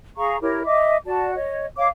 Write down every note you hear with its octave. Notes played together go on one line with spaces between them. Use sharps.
G#4 F5 A#5 C#6
E4 G4 A#4 C#5
D#5 E5 D6
F#4 D5 A5
C#5 D#5
C#5 D#5 F5 D6